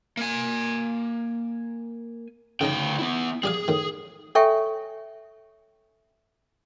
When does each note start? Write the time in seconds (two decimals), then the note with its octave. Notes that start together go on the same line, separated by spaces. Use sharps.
0.17 A#3 G#5
2.61 D2 C#3 D#4 G5 A#5
2.99 B3 E4
3.43 G3 G4 G#4 F5
3.68 A2 D#3
4.35 A4 C#5 E5 G5 G#5 C#6